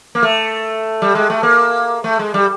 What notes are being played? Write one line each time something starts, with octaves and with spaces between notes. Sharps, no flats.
A#3
A3
G3
G#3
A3
A#3
A3
G#3
G3